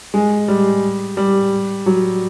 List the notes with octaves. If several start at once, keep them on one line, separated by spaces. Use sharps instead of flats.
G#3
G3
G3
F#3